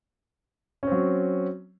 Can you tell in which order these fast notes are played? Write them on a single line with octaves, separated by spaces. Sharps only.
C#4 C4 F#3